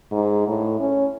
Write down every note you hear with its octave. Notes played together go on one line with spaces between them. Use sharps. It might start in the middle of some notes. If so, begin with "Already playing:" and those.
G#2
A2
C#4